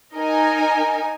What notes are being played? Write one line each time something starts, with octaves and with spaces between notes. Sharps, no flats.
D#4 A#4 D#5 G#5